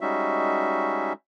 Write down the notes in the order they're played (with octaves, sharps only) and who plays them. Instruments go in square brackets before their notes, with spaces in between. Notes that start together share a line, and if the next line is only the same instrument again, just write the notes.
[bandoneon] G3 G#3 C#4 D#4 F#4 E5